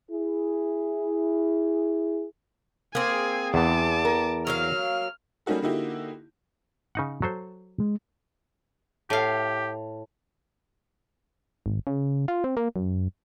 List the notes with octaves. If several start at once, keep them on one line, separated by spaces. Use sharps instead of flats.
E4 G#4
A#3 C4 G#4 G#5
E2 E3 A5 D6
A#4
F#3 A#3 F5 F6
G3 A#3 C#4 D#4 F#4 A4
D3 A#3 D#4 E4 F#4 G4
C#3 D#4 F#5
F#3 A4 C5
G#3
A2 G4 F5
G#1
C#3
F4
C4
A#3
F#2